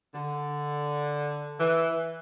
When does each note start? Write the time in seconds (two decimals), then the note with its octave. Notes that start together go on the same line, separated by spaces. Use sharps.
0.14 D3
1.59 E3